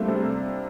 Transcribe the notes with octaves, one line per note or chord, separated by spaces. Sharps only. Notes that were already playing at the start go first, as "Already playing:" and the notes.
Already playing: G3 A3 A#3 C4 D4 F4
C3
A3